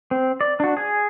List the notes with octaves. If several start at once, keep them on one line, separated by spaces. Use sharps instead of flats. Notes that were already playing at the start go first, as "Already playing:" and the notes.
C4
D5
D4 F#4
G#4 G#5